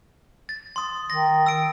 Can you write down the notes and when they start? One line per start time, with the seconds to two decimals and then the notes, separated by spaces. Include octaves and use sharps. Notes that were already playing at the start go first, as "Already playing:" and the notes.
0.49 A6
0.76 C6 D#6
1.10 D#3 A#6
1.46 E6 D7